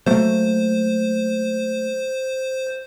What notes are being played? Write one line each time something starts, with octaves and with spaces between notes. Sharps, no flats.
F#3 A3 A#3 C5